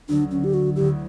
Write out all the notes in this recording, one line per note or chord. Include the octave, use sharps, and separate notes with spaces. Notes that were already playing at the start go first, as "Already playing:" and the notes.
D2 D3 F#3 D4
C#4
G4
F#4
D2 D3 F#3 A3 E4 G4